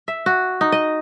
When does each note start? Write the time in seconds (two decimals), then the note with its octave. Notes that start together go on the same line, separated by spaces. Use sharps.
0.08 E5
0.26 F#4
0.61 D#4
0.72 D#5